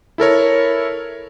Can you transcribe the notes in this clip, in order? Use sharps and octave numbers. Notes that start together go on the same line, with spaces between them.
E4 A4 A#4 C#5